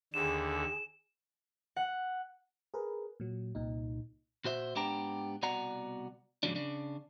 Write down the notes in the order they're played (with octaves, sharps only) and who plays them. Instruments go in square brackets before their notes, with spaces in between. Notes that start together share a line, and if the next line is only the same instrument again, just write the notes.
[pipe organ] D#2 D3 [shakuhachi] G#4 [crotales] E7
[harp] F#5
[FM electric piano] G#4 A#4 B4
A#2 F#3
C2 A#2 D#4
[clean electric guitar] A#2 F#4 C5 E5
G#2 B3 D4 G4 G5 A#5
C2 B2 F#4 D5 F#5 A#5
G#2 C#3 F3 F#3 D4
C#3 D4